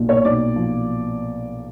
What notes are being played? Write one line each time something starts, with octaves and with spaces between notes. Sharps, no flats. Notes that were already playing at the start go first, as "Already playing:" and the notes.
Already playing: B1 A#2
C#5
B1 D5
F3